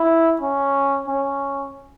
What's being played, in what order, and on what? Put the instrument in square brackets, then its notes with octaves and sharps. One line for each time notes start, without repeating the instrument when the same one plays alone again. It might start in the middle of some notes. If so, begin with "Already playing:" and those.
Already playing: [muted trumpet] E4
C#4
C#4